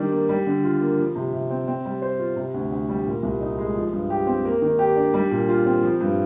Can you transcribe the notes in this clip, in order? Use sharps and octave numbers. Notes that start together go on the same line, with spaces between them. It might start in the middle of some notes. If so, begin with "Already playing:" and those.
Already playing: D#3 G3 D4
A#3
G3
D3
F4
A#3
F3
C3
C3
C4
C4
G3
C5
F4
C3
D2
D2
G3
A#2
C2
D#4
G#3
F3
G2
G4
C4
A#3
D#3
G4
D4
G3
A#2
F4
C4
F3
G2